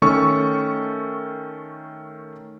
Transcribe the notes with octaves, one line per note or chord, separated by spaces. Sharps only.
D#3 A3 C#4 A4 C#6